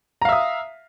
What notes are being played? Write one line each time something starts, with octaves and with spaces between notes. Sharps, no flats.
E5 F5 A#5 D#6